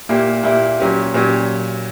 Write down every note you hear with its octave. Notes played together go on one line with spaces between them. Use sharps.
A#2 A#3 E4 G4
A#2 A#3 E4 G4
A#2 F#3 C#4 G4
A#2 F#3 C#4 G4